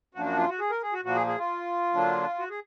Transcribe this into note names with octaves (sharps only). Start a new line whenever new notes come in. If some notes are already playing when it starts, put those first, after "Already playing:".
F#2 F3 A#3 D4 F#4
F#4
F4
F#4
G#4
A#4
G#4
F#4
A#2 F3 A#3 F#4
G#4
G#4
F4
D3 F#3 A#3 D4
F#4
G#4